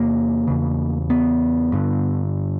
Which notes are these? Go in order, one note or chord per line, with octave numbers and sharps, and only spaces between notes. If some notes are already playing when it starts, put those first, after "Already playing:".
Already playing: E2 C3 A#3
E2 C#3
B3
G2 D3